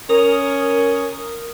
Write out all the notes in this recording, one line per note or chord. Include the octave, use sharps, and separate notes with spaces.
C#4 A#4 D#6